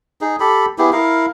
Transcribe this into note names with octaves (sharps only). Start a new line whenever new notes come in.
D#4 G#4
G4 A4 B5
B3 E4 G4 G#4
E4 A#4 F5